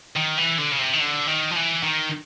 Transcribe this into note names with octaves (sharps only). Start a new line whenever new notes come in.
D#3
E3
D3
C#3
C3
D#3
D3
D#3
F3
E3
D#3